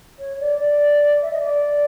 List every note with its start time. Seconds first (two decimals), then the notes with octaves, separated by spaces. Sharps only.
0.19 C#5
0.39 D5
0.59 D5
1.22 E5
1.31 D#5
1.40 D5